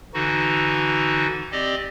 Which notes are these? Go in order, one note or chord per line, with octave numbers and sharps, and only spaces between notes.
D3 E3 D#4 F#4
C4 G4 D5 D#5